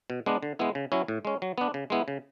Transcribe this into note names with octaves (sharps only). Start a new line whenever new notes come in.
B2
G#3 B3 D4
D3
G#3 B3 E4
C#3
F#3 C#4 E4
A2
G#3 C#4
F#3
B3 D4
C#3
G#3 B3 E4
C#3